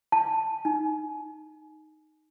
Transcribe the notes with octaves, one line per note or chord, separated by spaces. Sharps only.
A5
D#4